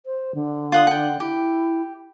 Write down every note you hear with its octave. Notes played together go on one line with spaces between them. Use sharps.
C5
D3
F4 F#5 D#6
F#5 G5
E4 G4